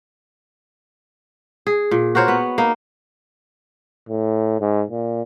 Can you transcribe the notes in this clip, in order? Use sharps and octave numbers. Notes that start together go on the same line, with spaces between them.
G#4
A#2
F#4 A#4 C5 C#5
B3
A#3 D#4
A2
G#2
A#2